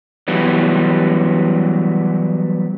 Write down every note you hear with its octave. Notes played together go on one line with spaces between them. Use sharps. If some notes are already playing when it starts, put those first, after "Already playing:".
E3 F#3 G3 B3